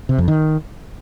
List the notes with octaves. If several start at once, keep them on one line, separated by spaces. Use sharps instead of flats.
C3
F2
D#3